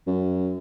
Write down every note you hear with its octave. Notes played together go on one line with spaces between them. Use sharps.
F#2